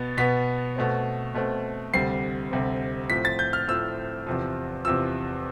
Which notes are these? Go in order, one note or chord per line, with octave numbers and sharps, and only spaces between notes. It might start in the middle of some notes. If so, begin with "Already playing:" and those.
Already playing: B2 B3 A6
B2 B3 B6
B2 A3 C4
B2 A3 C4
D2 C3 G3 C4 C7
D2 C3 G3 C4
A2 F3 C4 B6
A6
G6
F6
A2 F3 C4 E6
E2 C3 F3
E2 C3 F3 E6